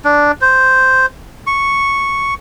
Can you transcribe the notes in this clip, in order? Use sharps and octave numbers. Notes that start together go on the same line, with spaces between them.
D4
C5
C#6